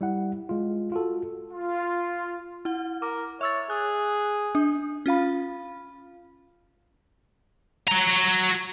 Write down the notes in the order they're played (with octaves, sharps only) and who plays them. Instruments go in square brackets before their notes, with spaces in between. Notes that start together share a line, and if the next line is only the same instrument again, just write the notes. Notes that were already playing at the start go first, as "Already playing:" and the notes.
[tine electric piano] G3 E4 F#5
G#3 F4
F4 F#4 A4
[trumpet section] F4
[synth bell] E4 F#5
[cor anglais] A#4 [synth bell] D6
[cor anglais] C#5 [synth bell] E5 E6 A6
[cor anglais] G#4 [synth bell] F#6
[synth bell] D4
C#4 F4 F5 B5
[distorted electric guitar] F#4 A#5